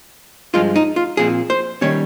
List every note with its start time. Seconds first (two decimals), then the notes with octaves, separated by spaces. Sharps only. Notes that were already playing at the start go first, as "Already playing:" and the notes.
0.54 G2 F3 G#3 F4
0.76 D#4
0.96 F4
1.17 A#2 F3 C4 G#4
1.50 C5
1.81 D#3 G3 A#3 C#4 C#5